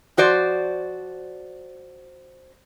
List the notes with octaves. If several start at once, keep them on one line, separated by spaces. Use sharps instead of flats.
F3 F#4 C5 D5